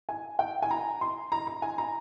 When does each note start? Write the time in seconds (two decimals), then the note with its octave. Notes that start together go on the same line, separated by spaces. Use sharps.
0.09 G#5
0.39 G5
0.62 G#5
0.71 A#5
1.01 C6
1.32 A#5
1.47 A#5
1.62 G#5
1.78 A#5